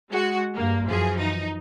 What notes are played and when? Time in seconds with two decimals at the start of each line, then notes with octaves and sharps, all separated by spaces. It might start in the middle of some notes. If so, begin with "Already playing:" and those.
0.10 G#3 F#4
0.54 G2 A#3
0.88 F#2 E3 F3 G#4
1.18 D#4